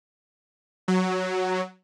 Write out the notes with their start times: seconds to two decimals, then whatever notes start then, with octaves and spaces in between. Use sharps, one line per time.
0.88 F#3